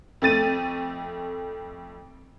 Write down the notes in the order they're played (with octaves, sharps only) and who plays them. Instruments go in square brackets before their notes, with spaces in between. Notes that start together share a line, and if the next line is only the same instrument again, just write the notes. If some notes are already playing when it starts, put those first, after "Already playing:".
[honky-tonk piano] F2 A3 A6 D#7